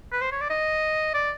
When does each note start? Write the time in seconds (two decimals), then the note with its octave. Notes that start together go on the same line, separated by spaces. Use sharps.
0.12 B4
0.21 C5
0.32 C#5
0.41 D5
0.50 D#5
1.14 D5